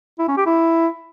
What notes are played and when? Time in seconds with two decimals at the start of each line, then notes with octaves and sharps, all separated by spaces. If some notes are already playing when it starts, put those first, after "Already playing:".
0.19 E4
0.28 C#4
0.37 G4
0.46 E4